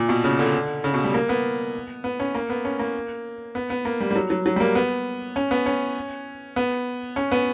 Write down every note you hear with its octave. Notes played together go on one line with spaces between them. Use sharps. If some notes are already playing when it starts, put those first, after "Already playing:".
Already playing: A#2
B2
C#3
D3
C#3
B2
G3
A#3
B3
B3
C#4
A#3
B3
C#4
A#3
B3
B3
A#3
G3
G3
F#3
F#3
F#3
G3
A#3
B3
C#4
B3
C#4
B3
C#4
B3